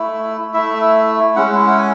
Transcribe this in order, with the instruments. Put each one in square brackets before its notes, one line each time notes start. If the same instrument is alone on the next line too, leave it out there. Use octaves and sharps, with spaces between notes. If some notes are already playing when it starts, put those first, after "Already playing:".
Already playing: [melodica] A3 E4
A3 E4 E5
G#3 C#4 E4 F#5
F#5
G#5